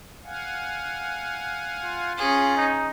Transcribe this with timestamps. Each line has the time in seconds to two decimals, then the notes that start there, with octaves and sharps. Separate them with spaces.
0.24 F5 F#5 G#5
1.83 F4
2.18 C#4 G#4
2.57 D#4